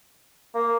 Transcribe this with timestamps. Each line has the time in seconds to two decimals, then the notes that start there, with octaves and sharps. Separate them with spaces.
0.55 A#3